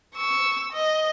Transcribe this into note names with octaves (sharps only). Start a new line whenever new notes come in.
C#6 E6
D#5